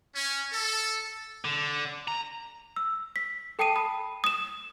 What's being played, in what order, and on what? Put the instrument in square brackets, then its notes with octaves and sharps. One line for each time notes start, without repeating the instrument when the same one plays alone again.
[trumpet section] C#4
A4
[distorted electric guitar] D3
A#5
[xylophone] E6
B6
A4 G5 A5 D#6 C7 D#7
B5 D#6
D#6 E7